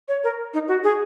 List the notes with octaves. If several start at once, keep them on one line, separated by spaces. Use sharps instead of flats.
C#5
A#4
D#4
F#4
G#4